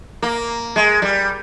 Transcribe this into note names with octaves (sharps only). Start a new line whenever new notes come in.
A#3
G#3
G3